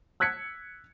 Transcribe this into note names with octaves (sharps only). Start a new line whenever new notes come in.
E6 F#6 G#6 B6 C#7